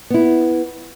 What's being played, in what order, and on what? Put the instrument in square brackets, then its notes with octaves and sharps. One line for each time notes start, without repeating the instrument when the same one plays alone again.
[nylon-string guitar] B3 E4